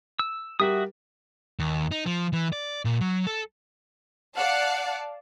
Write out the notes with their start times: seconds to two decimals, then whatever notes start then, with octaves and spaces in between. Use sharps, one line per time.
0.19 E6
0.60 G3 F#4 G4 A#4 E5 D#6
1.59 D#2
1.91 D#4
2.06 F3
2.33 E3
2.53 D5
2.85 A#2
3.01 F#3
3.27 A4
4.36 D5 F5 F#5 A5